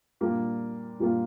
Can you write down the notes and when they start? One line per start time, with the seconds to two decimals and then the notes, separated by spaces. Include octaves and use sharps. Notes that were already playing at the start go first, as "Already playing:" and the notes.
0.21 A#2 G3 A#3 D4 F4
0.99 A#2 G3 A#3 D4 F4